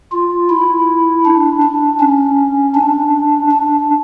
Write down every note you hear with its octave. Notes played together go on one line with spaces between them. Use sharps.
F4
E4
D4
D4
C#4
D4
D4